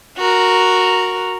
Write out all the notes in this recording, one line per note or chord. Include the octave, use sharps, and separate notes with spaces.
F#4 A#4